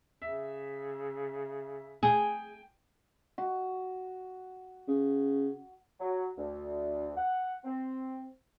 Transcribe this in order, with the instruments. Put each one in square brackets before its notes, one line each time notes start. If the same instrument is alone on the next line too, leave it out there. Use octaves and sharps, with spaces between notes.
[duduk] C#3 [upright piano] E5
[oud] G#4 [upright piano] G5 G#5
[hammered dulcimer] F#4
[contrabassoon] C#3
[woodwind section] F#3
D2
F#5
C4